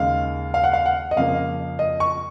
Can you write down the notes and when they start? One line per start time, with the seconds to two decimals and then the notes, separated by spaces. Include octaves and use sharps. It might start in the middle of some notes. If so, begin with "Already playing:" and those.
Already playing: D#2 C#3 G#3 F5
0.54 F5
0.64 F#5
0.73 F5
0.86 F#5
1.11 D#5
1.16 F2 C#3 F3 A#3 F5
1.79 D#5
2.00 C#6